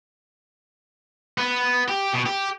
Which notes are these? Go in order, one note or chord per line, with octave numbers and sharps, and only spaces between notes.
B3
G4
B2
G4